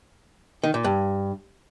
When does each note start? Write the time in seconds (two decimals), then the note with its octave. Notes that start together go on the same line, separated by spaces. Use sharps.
0.63 D#3
0.74 A#2
0.84 G2